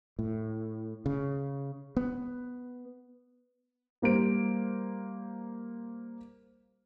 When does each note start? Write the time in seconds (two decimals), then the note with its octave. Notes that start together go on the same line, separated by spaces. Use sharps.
0.19 A2
1.06 C#3
1.97 B3
4.02 G3 A#3 C5 D7